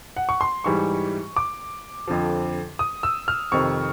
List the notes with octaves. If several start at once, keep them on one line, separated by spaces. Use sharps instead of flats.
F#5
C#6
C6
G#2 E3 G3 C#6
D6
F2 D3 F3
D#6
E6
F6
F2 C3 D#3 C#6